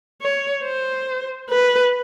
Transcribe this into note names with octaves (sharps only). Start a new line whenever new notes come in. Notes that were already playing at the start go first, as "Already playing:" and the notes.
C#5
C5
B4